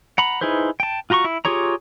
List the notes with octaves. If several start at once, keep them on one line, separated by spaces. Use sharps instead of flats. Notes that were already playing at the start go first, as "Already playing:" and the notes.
F#5 A#5 B5
D#4 E4 G#4 B4 C5
G5 A5
F4 F#4 A#5 C6 C#6
E4
F4 G4 G#4 C#5 A#5